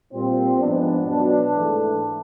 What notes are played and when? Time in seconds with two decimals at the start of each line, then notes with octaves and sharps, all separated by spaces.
0.13 A#2 G3 A#3 C4
0.60 G#2 F3 G#3 B3 D4
1.07 B2 F#3 B3 D4
1.53 G#2 E3 A3